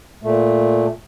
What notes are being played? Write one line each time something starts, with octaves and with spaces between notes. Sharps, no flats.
A#2 A3